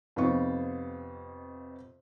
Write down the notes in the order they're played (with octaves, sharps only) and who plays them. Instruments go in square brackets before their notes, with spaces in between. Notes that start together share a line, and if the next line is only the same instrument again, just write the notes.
[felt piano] F2 C3 B3 D#4 F4 C#6